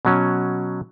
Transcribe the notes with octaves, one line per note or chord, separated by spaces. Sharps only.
B2 F#3 C#4